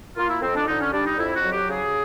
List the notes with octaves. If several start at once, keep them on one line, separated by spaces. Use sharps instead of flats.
A#3 F4
E4
F2 C4
D4
D3 D#4
C#4
G3 D4
D#4
F2 E4
F#4
F#3
G4
C#3 G#4